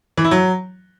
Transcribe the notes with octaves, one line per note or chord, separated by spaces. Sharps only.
E3
E4
F#3